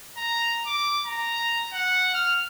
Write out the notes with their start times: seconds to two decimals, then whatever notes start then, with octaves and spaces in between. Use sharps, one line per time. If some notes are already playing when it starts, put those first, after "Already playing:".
0.17 A#5
0.66 D6
1.06 A#5
1.73 F#5
2.14 F6